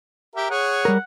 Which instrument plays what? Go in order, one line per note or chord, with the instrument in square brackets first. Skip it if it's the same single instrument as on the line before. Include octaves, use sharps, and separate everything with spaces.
[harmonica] G4 A#4 E5
[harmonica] G#4 C#5 [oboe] F#5
[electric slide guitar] G3 A#4